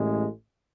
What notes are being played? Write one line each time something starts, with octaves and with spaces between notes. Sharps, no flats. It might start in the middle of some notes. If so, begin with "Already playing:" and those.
Already playing: A1 A2 G#3